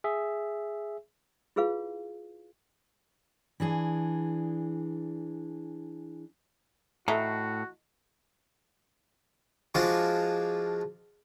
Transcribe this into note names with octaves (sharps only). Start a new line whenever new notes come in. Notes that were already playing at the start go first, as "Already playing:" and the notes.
G#4 E5
E4 F4 G#4 B4 F5
E3 D4 G#4
A2 E3 A3 D#4 F#4
F3 G#3 D4 F4 F#4